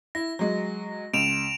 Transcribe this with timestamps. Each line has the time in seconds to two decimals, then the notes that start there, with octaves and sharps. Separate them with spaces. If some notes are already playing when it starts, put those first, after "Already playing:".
0.15 E4 A#6
0.39 F#3 G#3
1.14 C#2 D7 E7 F7